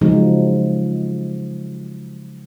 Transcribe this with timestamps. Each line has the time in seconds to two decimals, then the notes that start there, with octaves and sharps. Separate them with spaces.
0.01 C#3 F3 F#3 G#3 D#4